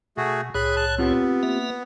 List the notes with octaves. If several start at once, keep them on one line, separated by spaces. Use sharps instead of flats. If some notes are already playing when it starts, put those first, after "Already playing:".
B2 A3 F#4 G#4
C2 A2 G#4 C#5 B5 F#6
A5 F#6
B3 C4 F4 G4
A#3 B4 E5